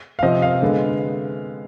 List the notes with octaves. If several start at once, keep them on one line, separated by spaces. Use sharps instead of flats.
F5
C3 F3 C4 D#5
F5
D3 G#3 B3